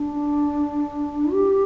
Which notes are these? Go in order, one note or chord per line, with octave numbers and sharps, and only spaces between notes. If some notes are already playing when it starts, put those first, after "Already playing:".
Already playing: D4
G4